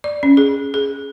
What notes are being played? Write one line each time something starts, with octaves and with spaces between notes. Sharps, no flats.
D5
C#4
G#4
G#4